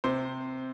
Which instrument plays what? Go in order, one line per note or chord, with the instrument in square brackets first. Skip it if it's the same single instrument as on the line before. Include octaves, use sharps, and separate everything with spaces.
[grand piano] C3 C5